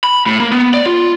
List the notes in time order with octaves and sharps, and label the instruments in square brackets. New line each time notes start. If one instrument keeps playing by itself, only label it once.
[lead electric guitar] B5
A2
A#3
B3
D5
F4